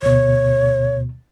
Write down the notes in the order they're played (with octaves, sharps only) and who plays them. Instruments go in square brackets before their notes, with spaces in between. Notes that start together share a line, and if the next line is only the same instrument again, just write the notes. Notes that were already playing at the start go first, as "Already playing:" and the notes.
[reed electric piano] D2 B2 [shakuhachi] C#5